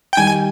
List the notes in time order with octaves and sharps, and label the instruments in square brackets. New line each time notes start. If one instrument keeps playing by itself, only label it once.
[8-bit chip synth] G5
[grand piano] D#3 G3 [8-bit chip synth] G#5